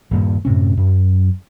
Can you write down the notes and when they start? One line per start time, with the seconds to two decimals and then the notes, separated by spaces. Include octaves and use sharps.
0.11 D#1 G2 A#2
0.45 F#2 A2 C3 C#4
0.77 F#2